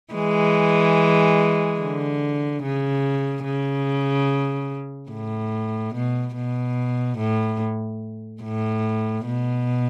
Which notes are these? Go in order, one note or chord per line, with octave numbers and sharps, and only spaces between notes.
E3 G#3
D3
C#3
C#3
A2
B2
B2
A2
A2
B2